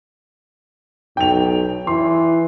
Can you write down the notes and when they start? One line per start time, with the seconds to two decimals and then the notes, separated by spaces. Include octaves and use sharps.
1.17 B1 G5 F7
1.87 E3 C6